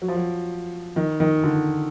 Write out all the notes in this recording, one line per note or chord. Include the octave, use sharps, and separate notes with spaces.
F#3
F3
F#3
D#3
D#3
D3